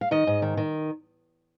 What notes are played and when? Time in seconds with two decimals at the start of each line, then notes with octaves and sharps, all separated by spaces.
0.01 F5
0.11 D#3 D#5
0.27 G#2
0.42 D#3
0.57 D#3